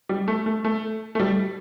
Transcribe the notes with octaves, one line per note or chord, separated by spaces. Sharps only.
G3
A3
A3
A3
A3
G3